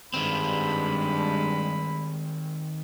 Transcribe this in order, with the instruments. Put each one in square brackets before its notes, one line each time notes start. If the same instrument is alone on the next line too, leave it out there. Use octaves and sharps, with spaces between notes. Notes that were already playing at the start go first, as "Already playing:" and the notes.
[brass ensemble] G2 [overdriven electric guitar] D#3 C4 [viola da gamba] G3 G#3 [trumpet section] B5